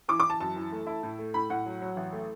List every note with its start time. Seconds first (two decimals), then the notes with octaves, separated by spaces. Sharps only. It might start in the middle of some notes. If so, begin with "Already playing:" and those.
0.08 E3 D6
0.20 D6
0.24 E3
0.30 A5
0.40 F#2 A5
0.56 E3
0.72 A3
0.86 E4
1.03 A2
1.19 A3
1.34 A2 B5
1.50 A2 F#5
1.66 F#3
1.81 F#3
1.96 A1
2.12 A3